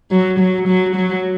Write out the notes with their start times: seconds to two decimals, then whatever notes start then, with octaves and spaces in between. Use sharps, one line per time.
0.11 F#3
0.39 F#3
0.67 F#3
0.95 F#3